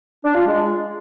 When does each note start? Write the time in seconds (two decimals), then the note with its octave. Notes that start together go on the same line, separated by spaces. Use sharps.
0.24 D4
0.35 F4
0.46 G#3